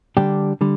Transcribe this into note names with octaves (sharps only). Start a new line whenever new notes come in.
D3 G3 D4 G4
D3 G3